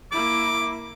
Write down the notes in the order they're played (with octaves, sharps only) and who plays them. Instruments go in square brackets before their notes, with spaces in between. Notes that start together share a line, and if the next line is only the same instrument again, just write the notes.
[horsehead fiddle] A#3 E4 [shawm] D6